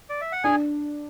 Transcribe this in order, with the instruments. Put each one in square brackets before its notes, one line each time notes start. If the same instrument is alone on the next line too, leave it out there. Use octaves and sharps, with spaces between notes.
[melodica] D5
E5
F#5
[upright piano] D4 [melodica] G#4 G#5